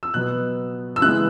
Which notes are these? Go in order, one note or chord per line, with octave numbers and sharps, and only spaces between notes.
E6
B2 F#3 B3 F#6
E6
C#3 E3 G#3 B3 F#6